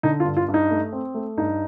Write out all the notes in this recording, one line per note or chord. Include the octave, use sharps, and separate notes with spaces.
D3 D#4
F4
G2
F4
G2
D#4
A3
C4
A3
G2 D#4